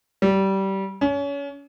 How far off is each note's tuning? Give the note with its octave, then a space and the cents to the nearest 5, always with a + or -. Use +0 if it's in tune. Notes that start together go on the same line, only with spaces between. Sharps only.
G3 -20
C#4 +30